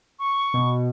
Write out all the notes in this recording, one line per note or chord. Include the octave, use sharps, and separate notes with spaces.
C#6
B2